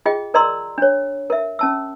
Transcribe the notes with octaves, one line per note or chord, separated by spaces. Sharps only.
F4 G#4 D#5 G5
A#4 D5 D#5 A#5 C6 E6
D4 C#5
A#4 E5
C#4 A5 E6